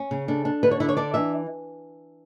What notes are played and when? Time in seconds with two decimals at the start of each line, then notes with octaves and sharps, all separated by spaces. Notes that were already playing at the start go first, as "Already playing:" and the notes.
Already playing: C#4
0.11 C#3
0.28 D4 A4
0.45 D4
0.63 D3 B4
0.71 C#5
0.80 D3 E4
0.89 C#5
0.97 D4 D5
1.14 E3 E5